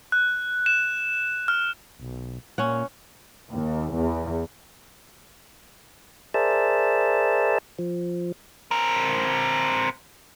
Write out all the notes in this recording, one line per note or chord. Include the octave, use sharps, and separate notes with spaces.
F#6
E7
F6
B1
A#2 C#4 C#5 F#5
D#2
E2
G#4 A#4 C5 D5 E5 A5
F3
C4 A#4